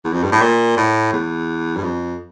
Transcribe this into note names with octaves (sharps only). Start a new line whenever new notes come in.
E2
F2
G2
A2
A#2
A2
E2
G2
F2